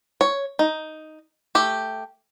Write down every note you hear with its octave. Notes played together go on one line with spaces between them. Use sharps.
C#5
D#4
A3 G4